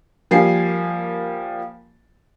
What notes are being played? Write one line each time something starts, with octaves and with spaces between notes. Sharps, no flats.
F3 G3 A#3 G#5 C7